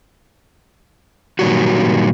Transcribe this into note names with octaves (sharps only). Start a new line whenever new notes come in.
A#2 D#3 E3 F#3 G3 F#4